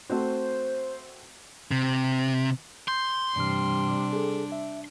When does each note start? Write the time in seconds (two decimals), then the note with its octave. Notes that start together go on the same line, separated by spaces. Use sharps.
0.10 A3 C4 F#4 C5
1.71 C3
2.88 C6 G6
3.36 G2 C3 E3 G3 D4 F6
4.13 G#4 A4
4.52 E5